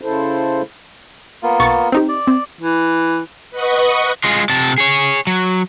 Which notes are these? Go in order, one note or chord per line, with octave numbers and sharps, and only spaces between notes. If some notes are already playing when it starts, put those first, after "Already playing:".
C#3 E4 A4 C5
A#3 B3 F4
B1 C#6 A6
C4 D#4 G4
D5
C4
E3
B4 D#5 F#5 C#6
G#3 F4
C3 A5
G#4 C#5
F#3